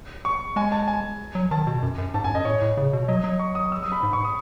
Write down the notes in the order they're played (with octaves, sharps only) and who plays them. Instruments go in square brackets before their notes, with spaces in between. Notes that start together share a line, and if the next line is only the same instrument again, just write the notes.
[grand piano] C#6
[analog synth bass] G#3 [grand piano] G#5
[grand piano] A5
G#5
[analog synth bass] F#3
[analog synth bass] D#3 [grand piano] A5
[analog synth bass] B2
F#2
F#2
[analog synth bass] G#2 [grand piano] A5
[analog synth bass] F#2 [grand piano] G#5
[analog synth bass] F#2 [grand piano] D#5
[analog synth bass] A2 [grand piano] C#5
[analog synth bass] A2
C#3
B2
[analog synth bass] F#3 [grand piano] D#5
[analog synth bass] F#3
[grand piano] C#6
D#6
E6
D#6
B5
[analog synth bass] G#2
[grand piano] C#6
D#6